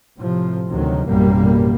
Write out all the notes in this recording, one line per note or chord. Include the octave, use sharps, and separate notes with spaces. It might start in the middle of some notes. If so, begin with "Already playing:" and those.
A2 C3 F3
D2 C3 D#3 F#3
A1 F#2 B2 G3 A#3